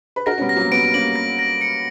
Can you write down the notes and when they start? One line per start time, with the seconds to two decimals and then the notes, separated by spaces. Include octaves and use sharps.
0.16 B4
0.26 F#4 A#4 A#6
0.38 C#4
0.41 G3 B3
0.49 A#6
0.56 F#3 A#3
0.72 G3 B3 D7
0.93 A#3 C#4 F#7
1.16 A#6
1.39 A#6
1.61 C#7